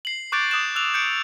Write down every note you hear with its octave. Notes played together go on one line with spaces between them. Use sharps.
C7 F#7
C#6 D6 F#6 G6 A6 D7
D6 D#6 F#6 E7
E6 F#6 F7
G6 C#7 D7